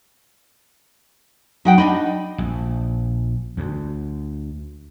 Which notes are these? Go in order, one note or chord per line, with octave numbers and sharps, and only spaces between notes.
F#3 D#4 F#5 G5
D4 D#4 D#5 B5
A#1
D2